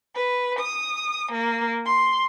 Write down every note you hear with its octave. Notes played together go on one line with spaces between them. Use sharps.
B4
D#6
A#3
C6